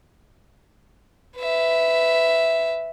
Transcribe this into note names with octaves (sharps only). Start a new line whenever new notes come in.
B4 E5